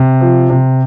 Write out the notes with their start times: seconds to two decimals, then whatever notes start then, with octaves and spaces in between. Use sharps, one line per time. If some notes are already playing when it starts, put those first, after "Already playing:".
Already playing: C3
0.21 F3
0.50 C3